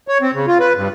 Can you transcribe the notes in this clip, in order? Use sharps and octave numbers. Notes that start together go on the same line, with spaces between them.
C#5
C4
C#3
F4
B4
G2